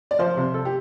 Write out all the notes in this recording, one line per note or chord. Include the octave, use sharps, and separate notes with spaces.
D5
F3 C5
C3
A4
G4